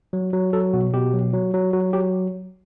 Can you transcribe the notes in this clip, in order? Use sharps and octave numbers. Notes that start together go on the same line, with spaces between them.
F#3
F#3
F#3 A4
B2 F#4
B2 G4
F#3
F#3
F#3
F#3 F#4
F#3 G4